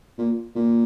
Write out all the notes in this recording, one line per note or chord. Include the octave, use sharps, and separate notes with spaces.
A#2
A#2